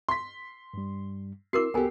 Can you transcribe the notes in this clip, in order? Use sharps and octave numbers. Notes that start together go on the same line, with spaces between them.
C6 B6
G2 G3
C4 E4 F#4 A#4 D6 E6 C7
C2 B3 G4 A4 A#4 G#5